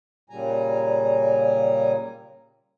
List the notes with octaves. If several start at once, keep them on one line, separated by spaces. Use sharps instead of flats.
A#2 C#3 G3 G#5 A#5